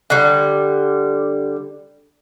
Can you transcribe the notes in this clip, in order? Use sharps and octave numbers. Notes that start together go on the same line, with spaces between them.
D3 G3